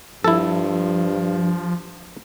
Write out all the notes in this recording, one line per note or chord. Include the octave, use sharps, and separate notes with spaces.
G2 F3 E4 A4